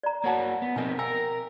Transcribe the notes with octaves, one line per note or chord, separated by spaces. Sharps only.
D5 A#5
A#3 F#4 C#5 F#5 A5
B3
B2 F3 C4 D#4 A#4 D#5 G#5
A#4 F5 G5 G#5 E6